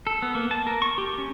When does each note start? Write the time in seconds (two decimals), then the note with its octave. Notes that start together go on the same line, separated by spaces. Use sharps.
0.07 A4
0.22 B3
0.35 A#3
0.51 A5
0.67 A#4
0.82 C#6
0.98 G4
1.18 C#4